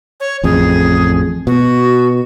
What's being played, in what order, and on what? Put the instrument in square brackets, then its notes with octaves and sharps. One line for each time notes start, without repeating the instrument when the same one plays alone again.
[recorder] C#5
[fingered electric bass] A1 F2 [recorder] G#4
[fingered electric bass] B2 [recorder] F#4